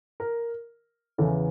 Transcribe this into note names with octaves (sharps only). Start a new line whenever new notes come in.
A#4
E2 C#3 E3 A4